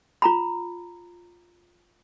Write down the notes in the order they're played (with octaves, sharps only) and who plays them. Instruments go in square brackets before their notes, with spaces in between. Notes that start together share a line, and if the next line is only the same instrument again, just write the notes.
[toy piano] F4 A#5 B5